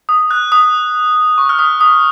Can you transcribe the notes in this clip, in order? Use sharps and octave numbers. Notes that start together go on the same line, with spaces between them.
D#6
F#6
D#6
C#6
F6
D#6
D#6